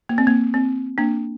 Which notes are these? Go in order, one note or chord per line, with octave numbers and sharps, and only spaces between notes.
A#3
C4
A#3
C4
A#3 D4